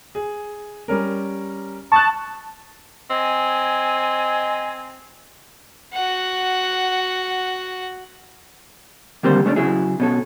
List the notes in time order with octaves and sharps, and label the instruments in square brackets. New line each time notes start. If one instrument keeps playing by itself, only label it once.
[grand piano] G#4
G3 C#4 A#4
[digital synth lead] A5 [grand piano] C#6 D#6 F#6
[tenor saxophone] C4 [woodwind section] D#5 G#5
[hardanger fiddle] F#4 F#5
[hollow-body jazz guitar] D3 D#3 G3 A#3 C4 C5
C#3 A3 A#3 C#4 D4
C#3 F#3 E4 G#4
B2 C#4 A4